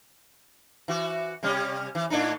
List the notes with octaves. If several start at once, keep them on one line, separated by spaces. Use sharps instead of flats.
E3 F#4
C3 G3 C#4
E3
A2 D4 D#4